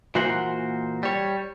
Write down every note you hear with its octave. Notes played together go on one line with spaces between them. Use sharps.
A#2 E3 A#3 F#4 C5 F#5
G3 C#5